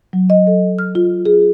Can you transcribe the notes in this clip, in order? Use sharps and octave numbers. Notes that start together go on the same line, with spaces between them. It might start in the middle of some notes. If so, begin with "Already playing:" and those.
F#3
D#5
A4
F6
F4
G#4